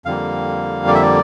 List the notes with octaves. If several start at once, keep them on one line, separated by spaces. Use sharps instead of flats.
F2 D3 G3 A#3 F5
D5
E5
D5